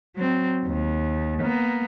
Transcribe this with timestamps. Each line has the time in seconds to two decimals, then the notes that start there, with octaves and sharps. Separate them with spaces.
0.16 F#3 C4
0.66 D#2
1.40 A#3 B3